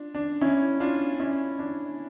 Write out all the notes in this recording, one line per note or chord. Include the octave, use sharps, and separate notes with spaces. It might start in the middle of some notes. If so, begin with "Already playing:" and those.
Already playing: D4 F4
D4
C#4 E4
D4 F4
C#4 E4
D4